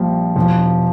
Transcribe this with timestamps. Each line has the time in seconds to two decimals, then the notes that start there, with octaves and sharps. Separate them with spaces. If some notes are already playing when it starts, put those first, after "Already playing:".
Already playing: A#1 A#2 F3 G3
0.36 E1 F3